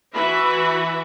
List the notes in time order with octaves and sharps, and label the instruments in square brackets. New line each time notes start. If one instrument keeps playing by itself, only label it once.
[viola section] E3 E4 F#4 B4 E5 B5